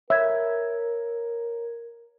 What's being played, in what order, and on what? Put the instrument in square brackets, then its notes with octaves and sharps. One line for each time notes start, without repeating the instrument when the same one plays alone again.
[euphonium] A#4 [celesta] C#5 G#6 [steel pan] E5